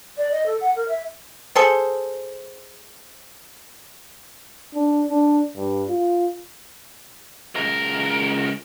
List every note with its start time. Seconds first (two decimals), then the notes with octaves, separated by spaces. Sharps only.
0.17 D5
0.32 D#5
0.46 A4
0.61 F#5
0.76 A#4
0.88 E5
1.56 G#4 A4 C5
4.75 D4
5.09 D4
5.56 G2
5.89 F4
7.55 C#2 A#4